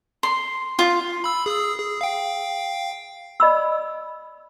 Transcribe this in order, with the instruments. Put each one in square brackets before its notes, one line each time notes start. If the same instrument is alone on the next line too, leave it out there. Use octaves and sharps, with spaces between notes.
[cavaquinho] C6
F4
[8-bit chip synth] B5 E6
G#4 D#6 E6
G#4
F5 G5
[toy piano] D5 D#5 B5 E6